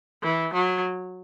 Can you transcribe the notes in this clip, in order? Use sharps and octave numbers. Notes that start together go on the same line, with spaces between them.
E3
F#3